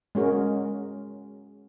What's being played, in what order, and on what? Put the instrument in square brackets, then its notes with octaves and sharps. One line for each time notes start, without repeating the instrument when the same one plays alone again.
[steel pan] G#3 C#4 F#4 A#4